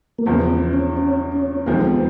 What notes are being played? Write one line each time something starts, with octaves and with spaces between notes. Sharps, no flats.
A#3
E2 C#3 F3 B3
C4
C#4
C#4
C#4
D#2 D3 F3 G#3 B3
C4
B3